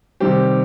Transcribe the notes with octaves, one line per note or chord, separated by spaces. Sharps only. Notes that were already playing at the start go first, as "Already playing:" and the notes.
C3 D#3 G3 C4 G4